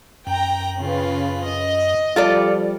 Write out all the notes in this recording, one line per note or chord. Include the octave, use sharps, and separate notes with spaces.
F#2 G5 A#5
C#3 F4 B4
D#5
F3 G3 F4 A4 D5